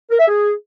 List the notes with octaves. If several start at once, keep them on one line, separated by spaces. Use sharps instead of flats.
A#4
E5
G#4